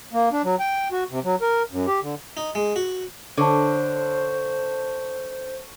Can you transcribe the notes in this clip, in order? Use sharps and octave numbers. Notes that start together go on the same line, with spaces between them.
A#3
D4
F#3
G5
F#4
C3
F#3
A#4
F#2
G4
D3
D#4
G#3
F#4
D3 C5 C#5 A5